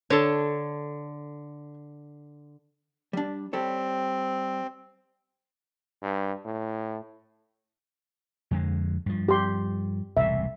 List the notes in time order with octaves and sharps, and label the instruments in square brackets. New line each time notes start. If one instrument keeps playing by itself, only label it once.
[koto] D3 [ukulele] A4 C#5
[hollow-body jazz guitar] G3 D4
[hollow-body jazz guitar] G3 A4 C#5 [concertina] C4
[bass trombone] G2
A2
[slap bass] F2 D3 G#3
G2 F3
[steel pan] G4 C6
[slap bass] E1 C2 A2 [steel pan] E5